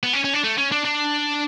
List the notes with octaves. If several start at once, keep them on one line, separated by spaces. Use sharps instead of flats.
B3
C#4
C#4
D4
A3
C#4
D4
D4